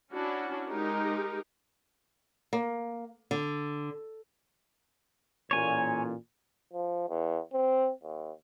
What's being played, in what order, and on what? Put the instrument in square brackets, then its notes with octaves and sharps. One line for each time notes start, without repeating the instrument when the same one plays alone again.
[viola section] C#4 D4 E4 F#4
G#3 D#4 G4 A#4
[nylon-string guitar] A#3
D3
[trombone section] A1 A#2 [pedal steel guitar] C#5 G#5
[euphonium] F3
E2
C4
D#2